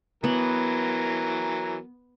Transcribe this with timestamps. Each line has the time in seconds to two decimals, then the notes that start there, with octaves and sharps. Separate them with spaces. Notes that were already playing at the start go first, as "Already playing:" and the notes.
0.24 E3 F#3 B3 A#4